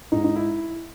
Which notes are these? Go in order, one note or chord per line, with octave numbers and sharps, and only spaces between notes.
G#2 D#4
D#4
E4